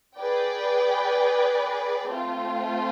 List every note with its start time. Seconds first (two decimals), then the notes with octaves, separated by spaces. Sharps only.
0.17 G#4 B4 D5 G5
2.08 A3 C4 F4